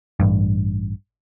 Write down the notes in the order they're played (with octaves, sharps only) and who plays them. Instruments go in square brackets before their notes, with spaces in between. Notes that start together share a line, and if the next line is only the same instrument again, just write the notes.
[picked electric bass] A1 G2